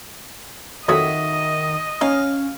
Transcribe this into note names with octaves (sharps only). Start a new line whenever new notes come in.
F2 D#3 F#3 F#4 D#5 E5 G#5 D#6
C#4 D#4 F5